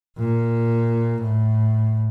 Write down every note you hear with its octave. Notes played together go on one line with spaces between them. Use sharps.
A#2
A2